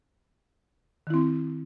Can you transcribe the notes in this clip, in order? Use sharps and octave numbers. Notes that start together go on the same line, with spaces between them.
D#3 C4 E4